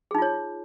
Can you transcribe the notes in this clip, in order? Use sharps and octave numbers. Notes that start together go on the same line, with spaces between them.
D#4 F4 G#4 C#5